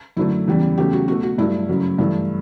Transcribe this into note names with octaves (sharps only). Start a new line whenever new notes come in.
F#2 D3 F#3 A3 E4
E2 C#3 E3 G3
E2 C#3 F#3 A3 G4
F#4
B2 A3 F#4
F#4
G2 F#3 A3 E4
F#2 C#3 F#3 A3
G2 E3 A3 E4